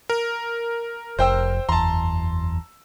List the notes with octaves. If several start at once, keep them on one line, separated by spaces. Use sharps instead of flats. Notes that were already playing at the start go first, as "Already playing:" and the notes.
A#4
F1 C5 G5 E6
F#1 E2 A5 A#5 C6